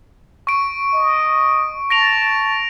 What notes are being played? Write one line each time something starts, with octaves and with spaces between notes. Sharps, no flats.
C#6 D7
D#5
A5 A#6 D7 F7